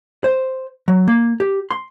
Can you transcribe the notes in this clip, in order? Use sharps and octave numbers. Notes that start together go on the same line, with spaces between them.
C5
F#3
A#3
G4
C6